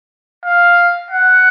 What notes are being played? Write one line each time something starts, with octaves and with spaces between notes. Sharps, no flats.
F5
F#5